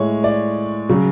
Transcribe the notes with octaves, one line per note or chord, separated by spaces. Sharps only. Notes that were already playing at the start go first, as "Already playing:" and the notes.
Already playing: A2 G#3 C#5
D5
C#3 F#3